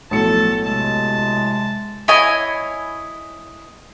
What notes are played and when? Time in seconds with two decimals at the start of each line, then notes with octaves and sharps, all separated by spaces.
0.11 B1 A2 F3 A4 A5 C#7
0.64 C3 G#3 A5
2.08 E4 C#5 D#5 G#5